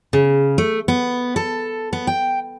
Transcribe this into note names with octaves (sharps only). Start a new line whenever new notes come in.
C#3
A3
B3
A4
B3
G5